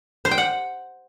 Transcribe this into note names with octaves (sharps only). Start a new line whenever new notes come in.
C5
G5
F#5